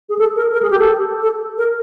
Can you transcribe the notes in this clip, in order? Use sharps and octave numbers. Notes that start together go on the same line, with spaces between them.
G#4
A4
A#4
A#4
G#4
G4
A4
A4
A#4